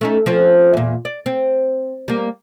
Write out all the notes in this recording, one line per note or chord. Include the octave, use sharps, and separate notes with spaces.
A3 C#4 D#4
F3 C4 C#4
E2 A#2
D5
C4
G3 A#3